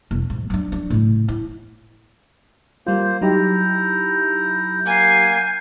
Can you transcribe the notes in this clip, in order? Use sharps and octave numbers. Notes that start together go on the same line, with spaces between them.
E1
G#2
F#3 D4
D4
A2 C#3
E4
G3 A#3 F4 C5 G6
F#3 D#4 E4 G4 A#5
A#3 A#4 F#5 G#5 C7